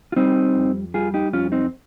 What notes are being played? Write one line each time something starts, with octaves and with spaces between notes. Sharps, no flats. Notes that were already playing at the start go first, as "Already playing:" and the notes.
F4
G3 C4 D#4
F2
G3 F4 G#4
D#4 G4
F2 C#4 F4
C4 D#4